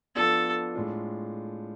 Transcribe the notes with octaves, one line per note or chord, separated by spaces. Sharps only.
F3 B3 D4 F4 A4
A2 G#3 D4 F4